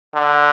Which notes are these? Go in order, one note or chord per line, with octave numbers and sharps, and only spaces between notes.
D3